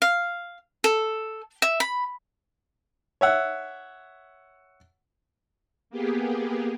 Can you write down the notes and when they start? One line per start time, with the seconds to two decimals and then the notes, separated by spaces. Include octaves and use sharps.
0.02 F5
0.84 A4
1.62 E5
1.80 B5
3.21 C#5 E5 F#5
5.90 A#3 B3 G4 G#4